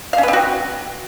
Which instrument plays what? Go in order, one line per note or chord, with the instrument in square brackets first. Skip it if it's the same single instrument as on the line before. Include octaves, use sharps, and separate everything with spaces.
[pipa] F5
C#4
B4
C4
F#4